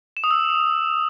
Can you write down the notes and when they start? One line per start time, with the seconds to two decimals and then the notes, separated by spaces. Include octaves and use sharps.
0.17 E7
0.24 D#6
0.31 E6